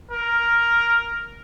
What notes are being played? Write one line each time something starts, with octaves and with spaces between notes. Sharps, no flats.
A#4